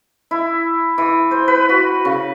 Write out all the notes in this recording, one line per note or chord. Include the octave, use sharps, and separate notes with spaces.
E4
E3
C5
B4
F#4
C#3